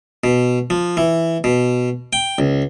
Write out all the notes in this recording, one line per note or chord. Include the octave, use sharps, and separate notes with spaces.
B2
F3
E3
B2
G5
C#2